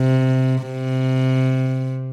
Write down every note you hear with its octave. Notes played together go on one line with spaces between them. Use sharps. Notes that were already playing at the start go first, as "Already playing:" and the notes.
Already playing: C3
C3